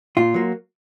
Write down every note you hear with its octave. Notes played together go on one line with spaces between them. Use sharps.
A#2 F4
F#3 A#3